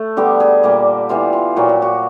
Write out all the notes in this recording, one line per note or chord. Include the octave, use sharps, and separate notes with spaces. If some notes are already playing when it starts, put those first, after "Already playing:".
Already playing: A3
D3 G3 B3 G4
G#4
A#2 G3 A#3 G4
E3 G3 B3 F4
F4
A#2 F#3 A#3 F#4
G4
F#4